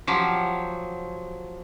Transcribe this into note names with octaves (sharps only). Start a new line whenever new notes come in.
F3 F#3 G4